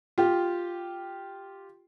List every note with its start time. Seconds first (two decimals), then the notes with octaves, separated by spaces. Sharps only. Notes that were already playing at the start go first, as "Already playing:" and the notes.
0.18 F4 G4